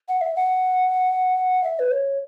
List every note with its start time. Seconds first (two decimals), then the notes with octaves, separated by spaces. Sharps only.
0.09 F#5
0.21 E5
0.36 F#5
1.64 E5
1.79 B4
1.91 C#5